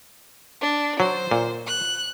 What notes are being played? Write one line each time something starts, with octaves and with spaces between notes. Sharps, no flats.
D4
F#3 C5
A#2
F#6